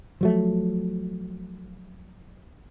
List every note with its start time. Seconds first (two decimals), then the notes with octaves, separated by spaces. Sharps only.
0.21 F3 F#3 A3